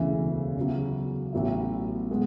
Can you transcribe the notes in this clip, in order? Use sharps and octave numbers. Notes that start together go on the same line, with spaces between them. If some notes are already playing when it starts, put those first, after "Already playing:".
Already playing: E1 D2 C#3 E3
E2 C#3 F#3
A1 A2 F#3 B3 E4
B2 G#3 B3